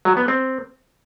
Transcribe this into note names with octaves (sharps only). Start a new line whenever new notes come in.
F#3
B3
C4